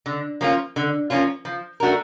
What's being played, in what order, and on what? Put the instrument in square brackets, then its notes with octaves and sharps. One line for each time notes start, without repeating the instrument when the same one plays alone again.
[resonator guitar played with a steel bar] D3
F3 A#3 C#4 F4
D3
F3 A#3 C#4 F4
F3
A3 D4 F#4 A#4